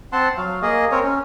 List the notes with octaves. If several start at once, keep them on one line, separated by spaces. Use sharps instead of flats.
C4 F#5 A5 C6
F#3 F5
A#3 G#4 D#5
C4 A#4 C#5
C#4